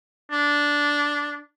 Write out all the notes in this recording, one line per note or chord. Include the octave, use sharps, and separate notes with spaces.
D4